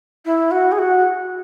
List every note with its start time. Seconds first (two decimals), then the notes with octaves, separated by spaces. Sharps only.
0.25 E4
0.51 F#4
0.72 G#4
0.78 F#4